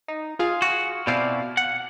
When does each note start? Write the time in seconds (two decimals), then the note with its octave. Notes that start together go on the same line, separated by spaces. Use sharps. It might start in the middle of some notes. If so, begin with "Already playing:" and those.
0.08 D#4
0.39 F4 G#4 F5
0.62 F#4
1.07 B2 C4 E4 D5 F5
1.57 F#5